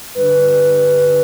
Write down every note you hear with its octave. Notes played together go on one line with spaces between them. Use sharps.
G2 D3 G3 B4